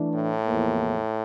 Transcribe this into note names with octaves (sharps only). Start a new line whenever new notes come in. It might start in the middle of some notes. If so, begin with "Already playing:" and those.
Already playing: E3 A3 D4
A2
E2 C3 F3 A#3